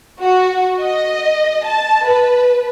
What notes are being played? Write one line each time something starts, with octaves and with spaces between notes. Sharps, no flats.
F#4
D#5
A5
B4